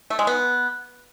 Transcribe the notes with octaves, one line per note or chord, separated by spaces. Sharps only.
A3
G#3
B3